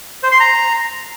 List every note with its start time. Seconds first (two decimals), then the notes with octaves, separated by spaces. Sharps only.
0.23 C5
0.32 C6
0.40 A#5